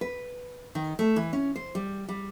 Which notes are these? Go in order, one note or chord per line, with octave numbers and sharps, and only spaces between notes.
B4
D#3
A3
E3
C#4
C5
G3
G3